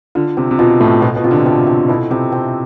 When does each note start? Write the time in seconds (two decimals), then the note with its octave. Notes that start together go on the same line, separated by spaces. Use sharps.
0.15 D3 F4
0.37 C3 C4
0.51 C3
0.59 B2 F4
0.80 A2 A3
1.02 B2 F4
1.16 B2
1.24 C3 F4
1.31 D3
1.46 C3 C4
1.67 C4
1.88 B2 E4
2.10 C3 C4
2.32 C4